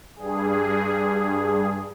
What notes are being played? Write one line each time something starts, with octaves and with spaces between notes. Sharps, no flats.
G2 G#4